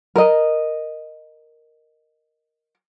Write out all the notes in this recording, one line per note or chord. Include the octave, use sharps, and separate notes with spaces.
A#4 D#5